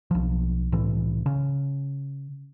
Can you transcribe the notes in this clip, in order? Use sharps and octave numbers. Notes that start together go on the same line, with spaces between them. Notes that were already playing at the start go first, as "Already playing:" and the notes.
B1 F3
C2 A2 E3
C#3